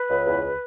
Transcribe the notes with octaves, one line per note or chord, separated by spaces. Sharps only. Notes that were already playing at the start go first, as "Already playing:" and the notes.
Already playing: B4
C#2
E2